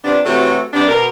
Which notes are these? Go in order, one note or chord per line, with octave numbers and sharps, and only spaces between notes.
C3 F3 B3 D4
C3 E3 F#3 A3 F#4 A4
C3 G3 B3 D4
B2 A#4